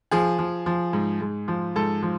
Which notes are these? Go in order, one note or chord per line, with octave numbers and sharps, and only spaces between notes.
F3 G#4
F3
F3
G#2
G#2
F3
G#2 A4
F3